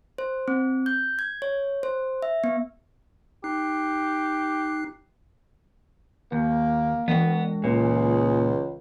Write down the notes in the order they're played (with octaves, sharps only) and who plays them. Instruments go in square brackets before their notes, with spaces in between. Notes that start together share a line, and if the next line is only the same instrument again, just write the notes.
[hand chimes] C5
C4
G6
G#6
C#5
C5
E5
B3
[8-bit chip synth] D#4 F#6 C7 [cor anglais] G4
[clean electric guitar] D#2 [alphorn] A#3
[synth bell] E3 G#3 [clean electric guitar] B3
[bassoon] C#2 [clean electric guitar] A#2 [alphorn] G#4